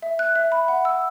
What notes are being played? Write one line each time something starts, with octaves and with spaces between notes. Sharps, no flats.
E5
F#6
E5
B5
F#5
E6